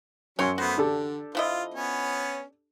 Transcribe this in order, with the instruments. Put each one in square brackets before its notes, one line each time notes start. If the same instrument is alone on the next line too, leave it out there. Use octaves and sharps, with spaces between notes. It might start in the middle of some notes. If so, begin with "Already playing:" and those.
[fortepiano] F#2 [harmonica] F#3 C#4 [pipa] C#5 G5 C6
[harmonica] A3 B3 C5 [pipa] F#4
[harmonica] D3 [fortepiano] D4 G4 A4
[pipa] F3 E4 D#5 [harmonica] F4
[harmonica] B3 C#4 C#5